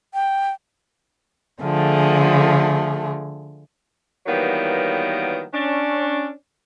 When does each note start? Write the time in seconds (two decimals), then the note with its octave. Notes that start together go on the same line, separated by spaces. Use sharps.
0.14 G5
1.63 D3 F3 A3 G#4
4.27 D#3 E3 F#3 G3 A#3 B3
5.53 C#4 D4